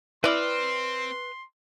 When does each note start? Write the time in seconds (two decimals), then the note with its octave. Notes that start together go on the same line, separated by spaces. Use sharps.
0.24 C4 E4 B4 D5 C6 F6